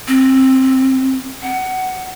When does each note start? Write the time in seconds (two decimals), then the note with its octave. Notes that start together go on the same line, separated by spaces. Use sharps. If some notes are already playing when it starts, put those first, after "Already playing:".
0.08 C4
1.42 F#5